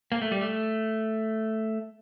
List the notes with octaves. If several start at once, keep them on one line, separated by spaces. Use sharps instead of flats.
A#3
A3
G3
A3